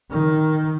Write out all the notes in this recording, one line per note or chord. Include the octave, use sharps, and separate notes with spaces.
D#3